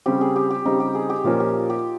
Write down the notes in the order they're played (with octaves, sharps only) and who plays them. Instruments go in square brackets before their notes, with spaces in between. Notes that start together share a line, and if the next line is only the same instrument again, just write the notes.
[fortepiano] C#3 G3 C4 [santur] G4
[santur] G#4
G4
G4
[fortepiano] C#3 G3 C4 [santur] D#4
[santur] G4
G#4
G4
[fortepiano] A#2 F3 A#3 C#4 [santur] F4
[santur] G4
G4